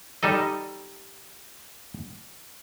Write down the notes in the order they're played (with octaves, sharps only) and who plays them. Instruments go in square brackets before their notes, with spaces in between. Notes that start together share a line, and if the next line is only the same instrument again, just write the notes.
[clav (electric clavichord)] G3 D#4 A4 D#5